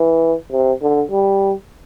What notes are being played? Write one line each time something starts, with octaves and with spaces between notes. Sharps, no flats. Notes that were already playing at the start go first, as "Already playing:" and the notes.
Already playing: E3
C3
D3
G3